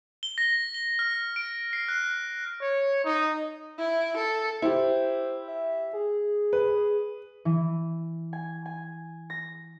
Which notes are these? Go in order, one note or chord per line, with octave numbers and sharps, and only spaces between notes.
G7
A#6
G7
F6
D7
C7
F#6
C#5
D#4
E4
A4
E4 G4 C5
E5
G#4
B4
E3
G#5
G#5
A#6